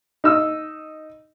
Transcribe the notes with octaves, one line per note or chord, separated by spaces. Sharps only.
D#4 E6